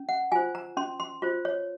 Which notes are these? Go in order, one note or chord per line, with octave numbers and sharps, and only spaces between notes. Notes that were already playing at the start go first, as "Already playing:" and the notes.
Already playing: C#4
F#5
F4 C5 G#5
A#5
C#4 C6
C6
F4 C5
C#5